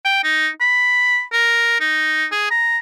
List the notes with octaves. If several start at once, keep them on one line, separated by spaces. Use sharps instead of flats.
G5
D#4
B5
A#4
D#4
G#4
A#5